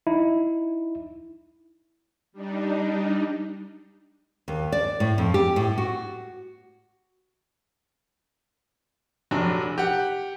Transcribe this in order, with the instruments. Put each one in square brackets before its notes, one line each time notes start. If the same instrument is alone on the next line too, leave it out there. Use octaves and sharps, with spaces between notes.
[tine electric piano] D#4 E4
[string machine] G3 D4 D#4
[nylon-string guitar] D#2
D5
A2
F2
G4
A2
F#4
[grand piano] F1 F#3 D4
G4 F#5